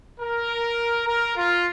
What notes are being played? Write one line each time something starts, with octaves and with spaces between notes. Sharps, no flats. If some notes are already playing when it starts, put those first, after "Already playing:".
A#4
A#4
F4